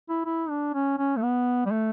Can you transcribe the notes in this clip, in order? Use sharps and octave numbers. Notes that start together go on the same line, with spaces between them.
E4
E4
D4
C#4
C#4
A3
B3
G3
A3